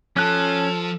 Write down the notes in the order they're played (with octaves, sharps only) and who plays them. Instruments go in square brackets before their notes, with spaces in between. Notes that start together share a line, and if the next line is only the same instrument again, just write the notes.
[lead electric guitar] F3 [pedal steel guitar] C#4 F#6 [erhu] A4